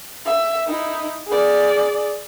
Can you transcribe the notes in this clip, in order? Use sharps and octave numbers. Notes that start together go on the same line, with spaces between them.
E5
D#4 E4
G#4 D5